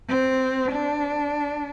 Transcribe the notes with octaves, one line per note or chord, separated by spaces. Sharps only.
C4
D4